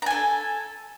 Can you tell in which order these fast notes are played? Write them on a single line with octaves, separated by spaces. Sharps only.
A#5 G#5 A4